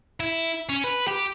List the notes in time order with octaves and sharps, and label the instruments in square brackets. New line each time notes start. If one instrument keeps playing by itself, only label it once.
[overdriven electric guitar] E4
C#4
B4
G4